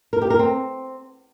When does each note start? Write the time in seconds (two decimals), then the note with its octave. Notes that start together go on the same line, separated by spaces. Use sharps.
0.13 A#4
0.22 G4
0.30 A#4
0.39 C4